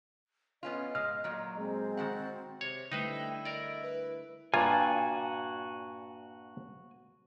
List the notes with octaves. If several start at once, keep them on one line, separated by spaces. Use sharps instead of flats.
B3 C#4 F4 D#5
G#3 F6
A#2 F#3
G#3 C4
D#3 F#4 F#5
C3 C#5
D3 G3 A3 D#4 E4 B4 C5 G5
A#4 D5 D#5
B4
G2 A#2 F4 F#4 G#5